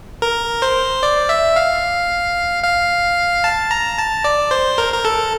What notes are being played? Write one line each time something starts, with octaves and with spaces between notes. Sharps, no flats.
A#4
C5
D5
E5
F5
F5
A5
A#5
A5
D5
C5
A#4
A#4
A4